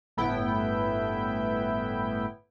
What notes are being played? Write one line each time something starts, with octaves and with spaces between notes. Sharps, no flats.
G1 A2 B3 E4 G5